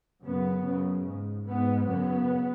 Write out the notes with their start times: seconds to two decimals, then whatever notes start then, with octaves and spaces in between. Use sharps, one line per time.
0.25 F#2 C#3 B3
0.65 F#2 C#3
1.06 G#2
1.46 G#2 B3
1.87 F#2 C#3 B3